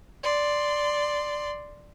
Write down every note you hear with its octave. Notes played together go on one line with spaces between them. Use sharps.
D5 C6